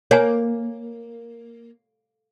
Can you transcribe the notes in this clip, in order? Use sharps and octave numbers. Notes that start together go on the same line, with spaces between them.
A#3 C#5 G#5